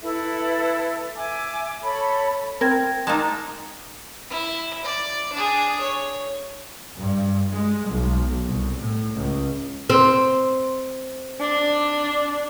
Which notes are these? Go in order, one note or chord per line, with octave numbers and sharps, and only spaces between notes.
E4 A4 B4 E5
E5 G#5 D6
A4 C#5 B5
C4 A#4 G5 G#6 A#6
G#3 A#3 D#4 A5
E4
D5
D4 G#4
C#5
G2
G#3
B1
C2
A2
C#2
C4
D4